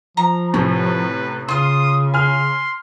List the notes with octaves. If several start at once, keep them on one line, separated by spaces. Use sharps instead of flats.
F3 A#5
A2 C3 C#4 B4
C#3 F4 F5 C6 D#6
G#5 C6 F6